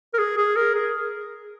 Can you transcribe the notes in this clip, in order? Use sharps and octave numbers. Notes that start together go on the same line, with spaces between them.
A#4
G#4
G#4
A#4
G#4